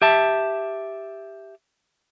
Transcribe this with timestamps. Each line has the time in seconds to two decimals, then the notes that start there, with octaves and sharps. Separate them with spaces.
0.02 G4 E5 A5